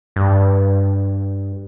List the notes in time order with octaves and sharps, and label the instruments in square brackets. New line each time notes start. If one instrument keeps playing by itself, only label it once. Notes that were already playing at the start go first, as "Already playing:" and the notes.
[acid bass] G2